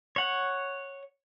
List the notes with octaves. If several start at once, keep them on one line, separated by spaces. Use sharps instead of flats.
C#5 F#5